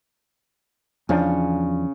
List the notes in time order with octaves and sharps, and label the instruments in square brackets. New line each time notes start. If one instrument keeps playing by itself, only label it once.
[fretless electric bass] E2 F3 D4 [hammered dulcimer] C#3